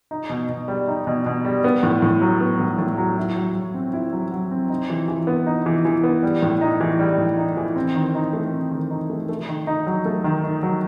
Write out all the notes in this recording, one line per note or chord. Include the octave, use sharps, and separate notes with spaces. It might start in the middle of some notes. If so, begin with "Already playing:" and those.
D#4
B2
B2
G3
D#4
B2
B2
G3
B3
A2
A2
F#3
B3
A2
A2
F#3
E4
F#3
F#3
C4
E4
F#3
F#3
C4
D#4
E3
E3
B3
D#4
E3
E3
B3
G3
A2
D#4
E3
G3
A2
D#4
E3
C4
D#3
D#4
A3
C4
D#3
D#4
A3
A3
D#3
D#4
F#3
A3
D#3
D#4
F#3